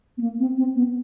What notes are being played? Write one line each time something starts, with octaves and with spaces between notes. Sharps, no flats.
B3
A#3
C4
C4
B3